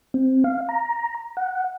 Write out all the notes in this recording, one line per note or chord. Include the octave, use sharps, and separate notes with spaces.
C4
F5
A#5
F#5